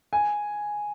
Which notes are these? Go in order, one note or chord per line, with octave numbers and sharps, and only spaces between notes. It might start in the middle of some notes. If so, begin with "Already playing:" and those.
G#5